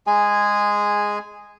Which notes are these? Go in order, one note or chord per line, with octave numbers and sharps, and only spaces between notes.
G#3 G#4 G#5